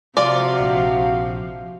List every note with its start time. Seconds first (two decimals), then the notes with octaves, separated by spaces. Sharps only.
0.17 C3 F3 F4 F#4 D5 F5
0.60 A#1